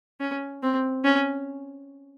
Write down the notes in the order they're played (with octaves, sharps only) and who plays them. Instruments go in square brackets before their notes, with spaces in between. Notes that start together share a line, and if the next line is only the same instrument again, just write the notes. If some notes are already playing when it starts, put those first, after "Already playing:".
[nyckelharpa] C#4
C4
C#4